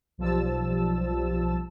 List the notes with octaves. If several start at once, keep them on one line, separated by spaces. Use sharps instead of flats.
B1 F3 G3 A5 E6